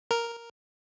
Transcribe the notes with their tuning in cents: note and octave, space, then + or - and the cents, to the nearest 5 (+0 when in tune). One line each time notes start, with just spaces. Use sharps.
A#4 +0